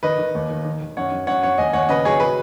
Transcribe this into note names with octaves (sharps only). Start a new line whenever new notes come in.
D#3 B4 D#5
D#3
D#2
D#3
D#3
D#3
F#2 C#5 F#5
F#2
F#2 C#5 F#5
F#2 C#5 F#5
D#2 D#5 G#5
D#2 C#5 F#5
C#3 B4 D#5
F#3 G#4 C#5
F#3 B4